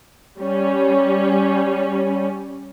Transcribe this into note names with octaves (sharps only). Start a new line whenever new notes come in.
G3 C#4